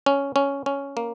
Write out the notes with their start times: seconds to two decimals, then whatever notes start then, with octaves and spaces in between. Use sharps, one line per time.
0.06 C#4
0.36 C#4
0.66 C#4
0.97 A#3